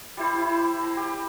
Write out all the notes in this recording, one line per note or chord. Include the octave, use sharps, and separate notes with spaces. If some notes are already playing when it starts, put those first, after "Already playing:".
G3 E4 C5
E4
A#5
G4